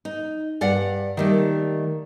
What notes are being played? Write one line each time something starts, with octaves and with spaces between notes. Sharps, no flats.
D#4
G2 D5 F5 F#5
D#3 G3 A3 A#3